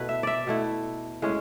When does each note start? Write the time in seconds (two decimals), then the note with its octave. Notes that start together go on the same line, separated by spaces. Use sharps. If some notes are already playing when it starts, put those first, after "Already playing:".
Already playing: B2 A3 E4 B4
0.09 E5
0.23 D5 E5
0.47 B2 A3 E4
1.22 A2 G#3 C#4